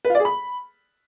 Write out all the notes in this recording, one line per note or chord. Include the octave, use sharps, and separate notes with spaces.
B4
F4
D5
G#4
B5